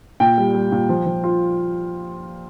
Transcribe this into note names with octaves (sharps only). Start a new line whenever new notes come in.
A#2 G5
G3
G3
A#2
F3
F3
F4